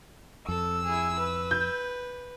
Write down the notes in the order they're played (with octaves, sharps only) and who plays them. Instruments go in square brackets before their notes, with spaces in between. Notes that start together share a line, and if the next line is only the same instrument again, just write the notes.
[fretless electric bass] F2 [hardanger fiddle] A4 [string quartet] E6
[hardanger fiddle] E4 G#4
B4
[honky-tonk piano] G6